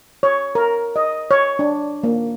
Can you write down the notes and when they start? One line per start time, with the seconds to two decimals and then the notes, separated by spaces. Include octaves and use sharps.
0.23 C#5
0.55 A#4
0.96 D#5
1.31 C#5
1.59 D4
2.04 A#3